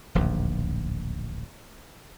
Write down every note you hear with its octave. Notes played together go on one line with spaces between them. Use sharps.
D1 A#1 D#2